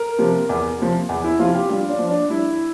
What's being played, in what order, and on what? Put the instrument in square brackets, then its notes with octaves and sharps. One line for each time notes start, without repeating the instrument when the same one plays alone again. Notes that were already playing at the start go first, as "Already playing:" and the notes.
Already playing: [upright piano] A#4
C3 F3
E2
C3 F3
E2
E4
C3 F3 F4
G4
G2 F4
D4
F3
D4
G2 E4